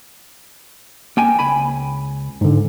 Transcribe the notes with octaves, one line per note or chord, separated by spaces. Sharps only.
A#3 G5 G#5
C#2 G#5 B5
G#2 D3